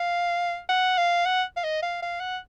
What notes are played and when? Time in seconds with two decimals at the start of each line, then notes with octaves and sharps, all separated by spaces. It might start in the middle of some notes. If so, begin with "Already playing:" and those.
Already playing: F5
0.69 F#5
0.98 F5
1.26 F#5
1.57 F5
1.63 D#5
1.83 F5
2.02 F5
2.20 F#5